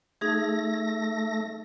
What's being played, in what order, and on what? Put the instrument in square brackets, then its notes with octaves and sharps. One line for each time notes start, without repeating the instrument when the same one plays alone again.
[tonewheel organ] A3 A#6 [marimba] D#4 G#4 G#6